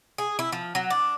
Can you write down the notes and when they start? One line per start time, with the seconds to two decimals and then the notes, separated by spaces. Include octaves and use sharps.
0.18 G#4
0.39 E4
0.52 F3
0.75 F#3
0.90 D4